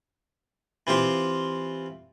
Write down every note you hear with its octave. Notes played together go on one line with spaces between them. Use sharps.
E3 C4 F4 G4 C5